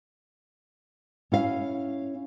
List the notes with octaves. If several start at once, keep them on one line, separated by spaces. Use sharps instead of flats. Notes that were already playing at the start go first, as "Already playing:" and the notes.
C#4 E4 F5